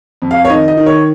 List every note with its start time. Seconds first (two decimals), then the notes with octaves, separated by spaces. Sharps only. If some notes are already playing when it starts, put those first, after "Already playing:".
0.22 F2
0.31 F5
0.45 C#5
0.50 D#3 D#5
0.68 D#5
0.77 D#3
0.86 C#5